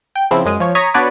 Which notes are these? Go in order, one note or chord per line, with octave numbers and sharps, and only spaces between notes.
G5
C#3 F3 C4 E4
F#2 G#3 D#7
F3 C#5
C#5 A#5 C#6 D#6 G#6 B6
B3 D4 F#4 B4 C#5 D5